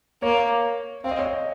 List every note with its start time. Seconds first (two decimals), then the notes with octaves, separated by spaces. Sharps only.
0.22 A#3 C#5
1.04 C4 F5
1.11 D#5
1.19 C#5
1.25 D#5